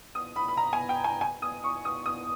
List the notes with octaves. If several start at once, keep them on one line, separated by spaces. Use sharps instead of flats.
D#6
B5
B5
A#5
G#5
G5
G#5
G#5
D#6
C#6
D#6
D#6